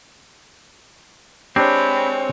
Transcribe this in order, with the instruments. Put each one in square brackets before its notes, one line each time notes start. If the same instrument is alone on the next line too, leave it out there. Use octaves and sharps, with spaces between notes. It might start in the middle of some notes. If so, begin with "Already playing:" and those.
[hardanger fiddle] G#3 C#5 [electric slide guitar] C4 [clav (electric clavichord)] D4 G4 [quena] B5